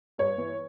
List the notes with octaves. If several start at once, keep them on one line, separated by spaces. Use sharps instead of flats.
G2 C#5
E3